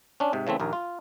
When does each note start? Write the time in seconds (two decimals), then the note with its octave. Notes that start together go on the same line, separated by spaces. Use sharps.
0.20 C#4 D4
0.33 G#2 C3
0.47 C#3 E3 A3 C4
0.60 A#1 D#2 A#4
0.73 F4